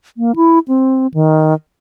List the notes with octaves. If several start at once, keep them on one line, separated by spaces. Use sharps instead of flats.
A#3
E4
C4
D#3